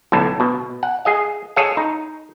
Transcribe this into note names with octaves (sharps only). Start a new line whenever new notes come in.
B1 A2 D3 A5
B2
F#5
G#4 D#5 F5
G#4 A4 C#5 D#5 F5
D#4